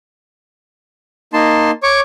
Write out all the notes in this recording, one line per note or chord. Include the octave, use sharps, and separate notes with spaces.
A#3 D#4 A5 C6
C#5 C#6 D6